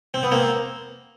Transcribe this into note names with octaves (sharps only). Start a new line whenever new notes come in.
C4
B3
A#3 C4